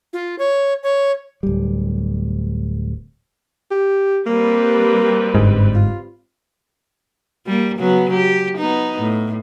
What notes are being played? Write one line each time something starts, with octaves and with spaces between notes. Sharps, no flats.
F4
C#5
C#5
D1 G3
G4
G3 A#3 C4 B4
G1 G#2
F4
G3 A#3
C#3 F#3 B3
G4
B3 D#4
A2